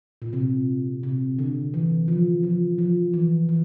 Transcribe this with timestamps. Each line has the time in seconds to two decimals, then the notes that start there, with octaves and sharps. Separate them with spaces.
0.22 A#2
0.33 C3
1.03 C3
1.39 D3
1.74 E3
2.08 F3
2.43 F3
2.78 F3
3.14 E3
3.49 E3